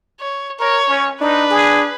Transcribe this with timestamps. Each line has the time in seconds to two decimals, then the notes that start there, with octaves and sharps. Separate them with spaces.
0.20 C#5
0.59 A#4 C#5
0.88 C#4
1.21 D4 D#4 B4
1.50 G#4